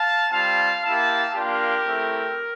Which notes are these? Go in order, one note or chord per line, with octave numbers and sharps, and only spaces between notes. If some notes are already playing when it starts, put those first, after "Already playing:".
Already playing: F5 A5
G3 C4 F4 F5 A5
A#3 E4 G4 F5 A5
A#3 D4 F4 G4 A#4
A3 C4 E4